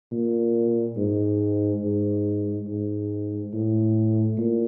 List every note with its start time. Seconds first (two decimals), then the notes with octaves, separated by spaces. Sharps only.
0.12 A#2
0.97 G#2
1.82 G#2
2.67 G#2
3.53 A2
4.37 A#2